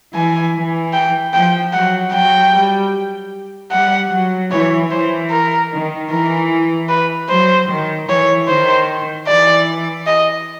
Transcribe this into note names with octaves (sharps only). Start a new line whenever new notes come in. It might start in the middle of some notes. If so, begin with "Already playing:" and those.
E3 G#5
E3
G5
F3 G5
F#3 F#5
F#3 G5
G3
G3 F#5
F#3
E3 C#5
E3 C5
A#4
D#3
E3 A#4
B4
F#3 C5
D#3
E3 C#5
D#3 C5
E3 D5
D#5